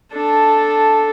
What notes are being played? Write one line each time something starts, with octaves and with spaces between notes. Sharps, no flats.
D4 A4